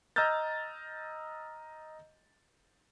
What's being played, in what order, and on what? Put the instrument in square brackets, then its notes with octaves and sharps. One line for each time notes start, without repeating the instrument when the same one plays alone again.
[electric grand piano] D#5 A#5 E6 F6 G6 A6